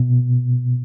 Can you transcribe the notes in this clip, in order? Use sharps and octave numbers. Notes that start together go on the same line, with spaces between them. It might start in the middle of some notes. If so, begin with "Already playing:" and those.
Already playing: B2